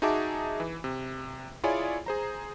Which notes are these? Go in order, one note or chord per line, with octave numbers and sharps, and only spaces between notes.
D#4 F#4 G#4 E5 A5 D6
E3
C3
E4 F4 G#4 C#5 D5 G#5
G#4 C5 A#5